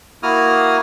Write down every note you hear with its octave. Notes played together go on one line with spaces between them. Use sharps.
A#3 E4 F#4 D#6 F6